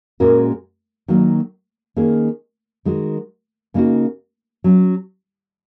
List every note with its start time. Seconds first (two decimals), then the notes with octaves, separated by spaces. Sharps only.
0.20 A#2 G#3 C#4 F#4 A#4
1.08 D#3 F#3 A#3 F#4
1.96 D#3 A#3 C#4 G#4
2.85 D#3 G#3 F#4
3.74 C#3 A#3 D#4 F#4
4.64 F#3 C#4